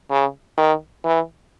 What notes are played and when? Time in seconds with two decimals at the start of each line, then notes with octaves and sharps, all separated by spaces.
0.10 C#3
0.58 D#3
1.04 E3